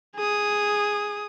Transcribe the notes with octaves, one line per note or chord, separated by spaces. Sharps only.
G#4 D#6